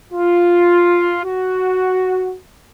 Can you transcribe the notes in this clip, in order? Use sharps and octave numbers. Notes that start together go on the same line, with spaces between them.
F4
F#4